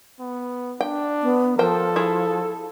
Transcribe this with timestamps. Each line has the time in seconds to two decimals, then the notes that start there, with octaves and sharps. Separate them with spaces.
0.20 B3
0.81 D4 G5
1.23 B3
1.59 F3 A4 A#4 C5 G5
1.96 E4 G#4